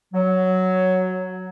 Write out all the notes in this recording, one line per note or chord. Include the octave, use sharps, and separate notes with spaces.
F#3